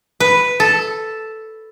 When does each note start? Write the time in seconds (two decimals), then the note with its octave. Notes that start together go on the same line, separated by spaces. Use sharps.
0.20 B4
0.60 A4